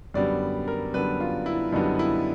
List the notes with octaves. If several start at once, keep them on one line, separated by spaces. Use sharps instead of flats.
F#2 D3 G3 B3 D5
A#4
F#2 D3 G3 B3 B4
F4
E4
F#2 D3 G3 B3 D#4
E4